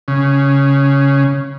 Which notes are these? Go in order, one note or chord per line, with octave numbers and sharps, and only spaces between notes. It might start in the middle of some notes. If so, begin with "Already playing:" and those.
C#3